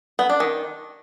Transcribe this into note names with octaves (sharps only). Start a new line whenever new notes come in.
B3
D4
D#3